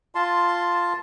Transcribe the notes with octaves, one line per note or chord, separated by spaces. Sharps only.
F4 A5 C6